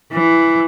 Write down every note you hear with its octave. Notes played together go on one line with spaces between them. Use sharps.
E3